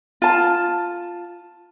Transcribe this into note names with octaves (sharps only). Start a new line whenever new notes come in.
F4 A5